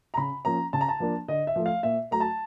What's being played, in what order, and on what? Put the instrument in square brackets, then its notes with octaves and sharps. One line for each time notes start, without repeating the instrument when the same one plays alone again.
[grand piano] A#5
C#3 B5
F3 A#3 C#4 A#5
C#3 A5
A#5
A5
F3 A#3 D4
D3 D#5
E5
F3 A3
F5
A#2 E5
F#3 A3 A#5
A5